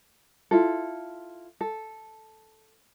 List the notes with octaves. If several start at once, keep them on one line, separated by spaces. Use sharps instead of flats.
E4 F4 A4
A4